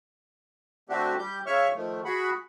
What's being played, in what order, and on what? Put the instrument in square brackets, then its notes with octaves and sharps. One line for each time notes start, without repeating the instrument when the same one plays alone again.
[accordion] D3 A3 C4 D4 F#4 G4
G3 G4 G6
C#3 C#5 E5 C#6 F6
D#3 F3 A3
F#4 G#4 F#5 B5